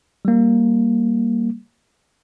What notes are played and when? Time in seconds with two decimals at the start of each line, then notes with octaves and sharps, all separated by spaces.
0.25 G3 A#3